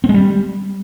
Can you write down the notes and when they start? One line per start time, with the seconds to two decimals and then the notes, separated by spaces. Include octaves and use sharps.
0.04 C4
0.09 G#3
0.14 G3